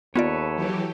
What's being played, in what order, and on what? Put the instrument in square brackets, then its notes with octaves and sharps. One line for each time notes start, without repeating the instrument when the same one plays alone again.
[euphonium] D#2 [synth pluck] B3 F4 D5 [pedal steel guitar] A4 B4 C#5
[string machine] E3 F#3 G4